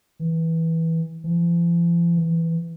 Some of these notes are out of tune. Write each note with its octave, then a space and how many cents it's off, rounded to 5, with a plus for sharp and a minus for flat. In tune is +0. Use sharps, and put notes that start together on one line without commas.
E3 -15
F3 -45
E3 +5